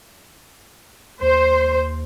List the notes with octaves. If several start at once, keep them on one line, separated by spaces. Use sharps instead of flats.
D#2 C5